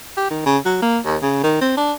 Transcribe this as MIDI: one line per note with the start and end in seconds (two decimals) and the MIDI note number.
0.17 0.28 67
0.30 0.45 51
0.46 0.58 49
0.65 0.79 54
0.82 0.99 58
1.06 1.17 39
1.22 1.43 49
1.43 1.58 51
1.61 1.73 60
1.77 1.93 62